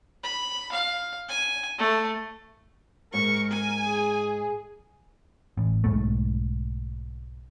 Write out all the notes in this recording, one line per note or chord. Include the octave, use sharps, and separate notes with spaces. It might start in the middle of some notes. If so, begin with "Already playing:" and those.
B5
F5
G#5
A3
G#2 A#4 C#6
G#5
G#4
A1
B1 F2 G#2 A3